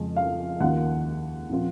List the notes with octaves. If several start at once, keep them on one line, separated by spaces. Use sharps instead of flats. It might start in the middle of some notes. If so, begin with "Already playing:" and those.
Already playing: F2 C#3 G#3
F5
D#2 D#3 A#3 F4 F#5
A#2 F3 C4 F4